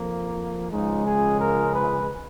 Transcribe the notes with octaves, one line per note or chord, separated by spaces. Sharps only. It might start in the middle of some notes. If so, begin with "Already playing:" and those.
Already playing: F2 F3 A#3
C#2 C#3 F3 G#3 D#4
G#4
A#4
B4